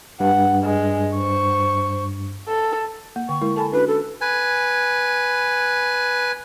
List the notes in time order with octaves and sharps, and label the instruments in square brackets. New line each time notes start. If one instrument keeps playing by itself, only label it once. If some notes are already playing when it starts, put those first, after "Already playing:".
[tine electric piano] G2 [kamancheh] F#5
[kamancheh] G#3
C5 C#6
A4
[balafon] A#3
[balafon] D3 G5 [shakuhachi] C#6
[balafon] G#3 E4 A#4
[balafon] A4 G#5 B5 [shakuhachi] A5
[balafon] C#4 D4 F#4 [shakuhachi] B4
[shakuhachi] A4
[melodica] B4 G#5